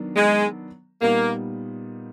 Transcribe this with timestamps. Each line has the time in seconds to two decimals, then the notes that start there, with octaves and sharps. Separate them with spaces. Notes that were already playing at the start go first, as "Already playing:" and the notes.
Already playing: D#3 F#3 B3 D4
0.15 G#3
1.01 A#2 G3 A#3 B3 D#4